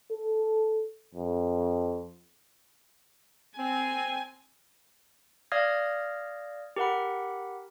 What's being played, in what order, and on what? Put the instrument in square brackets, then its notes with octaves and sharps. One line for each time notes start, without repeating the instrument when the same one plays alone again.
[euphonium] A4
F2
[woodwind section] C4 [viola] G#5
[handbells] D5 F5 D#6 F6 G#6 A#6
G4 A#4 F#5 B5